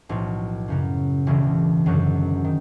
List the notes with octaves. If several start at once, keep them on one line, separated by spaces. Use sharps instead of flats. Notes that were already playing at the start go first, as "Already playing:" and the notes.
B1 A2 F3
F#2 C#3 F#3
E1 D2 C#3 E3
G#1 F#2 D3 F#3
D#3